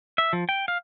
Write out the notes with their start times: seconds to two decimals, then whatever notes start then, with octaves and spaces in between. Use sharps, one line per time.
0.18 E5
0.33 F3
0.49 G5
0.68 F5